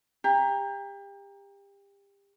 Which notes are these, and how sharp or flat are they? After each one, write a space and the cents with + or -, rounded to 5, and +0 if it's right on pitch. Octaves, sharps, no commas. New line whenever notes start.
G4 +30 A#5 +0